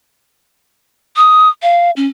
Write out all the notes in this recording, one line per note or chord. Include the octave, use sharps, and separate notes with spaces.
D#6
F5
C#4